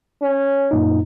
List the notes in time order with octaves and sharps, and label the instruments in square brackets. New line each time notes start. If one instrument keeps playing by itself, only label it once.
[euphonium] C#4
[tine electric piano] F#2 A#2 D#4